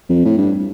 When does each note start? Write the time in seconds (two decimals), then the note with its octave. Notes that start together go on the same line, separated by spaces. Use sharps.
0.09 F2
0.25 A2
0.38 G2